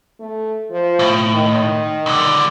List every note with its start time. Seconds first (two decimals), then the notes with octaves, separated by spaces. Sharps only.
0.20 A3
0.70 F3
0.99 A2
1.34 D#3
2.06 C#2 D3